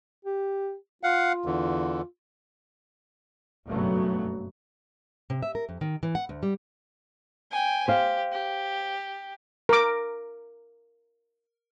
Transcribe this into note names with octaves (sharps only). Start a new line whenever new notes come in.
G4
F4 F5 F#5
E2 D3 E3
F#1 G2 B2 F#3 A3 B3
C3
E5
A#4
F2
D#3
E3
F#5
D2
G3
G5 G#5
G4 C5 F5
G4
A#4 D6